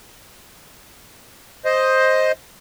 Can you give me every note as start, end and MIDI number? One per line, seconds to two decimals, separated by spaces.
1.65 2.32 72
1.65 2.32 75